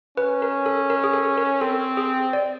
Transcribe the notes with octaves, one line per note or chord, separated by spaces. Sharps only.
C#4 B4
A#4
A4
A#4
G#4
A4
A#4
C4 A4
G#4
D5